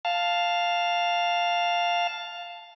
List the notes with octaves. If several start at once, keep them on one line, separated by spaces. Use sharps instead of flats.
F5 A5